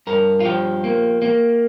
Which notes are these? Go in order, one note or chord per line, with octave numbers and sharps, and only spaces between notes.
G2 A#4
F4
F3 G4
A#3
A#3